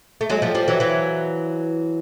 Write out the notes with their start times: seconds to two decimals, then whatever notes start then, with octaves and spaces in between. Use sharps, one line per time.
0.21 A3
0.30 F#3 G#3
0.42 F3 G3
0.55 F3 G3
0.68 E3 F#3
0.80 E3 F#3